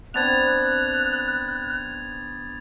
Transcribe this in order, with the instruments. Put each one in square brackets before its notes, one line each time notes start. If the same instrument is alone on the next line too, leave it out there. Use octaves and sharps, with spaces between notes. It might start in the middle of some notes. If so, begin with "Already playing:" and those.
[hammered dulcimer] B3 C4 D4 [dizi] F#6 [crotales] G#6 A6 F7